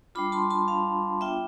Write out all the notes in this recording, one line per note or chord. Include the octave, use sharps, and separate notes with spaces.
G3 D4 F4 B5 D6
A5 C6
A5 C6
F5 A5
B3 D4 F4 E5 G5